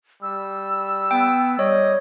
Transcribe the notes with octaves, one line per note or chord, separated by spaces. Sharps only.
G3 E6
B3 G5
G3 C#5 D#5